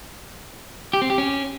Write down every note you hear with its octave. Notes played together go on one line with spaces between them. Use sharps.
G4
C4
G4
C#4